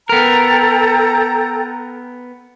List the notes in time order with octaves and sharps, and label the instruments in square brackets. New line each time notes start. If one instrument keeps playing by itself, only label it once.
[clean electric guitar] B3 A#4 [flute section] A4 G5 A#5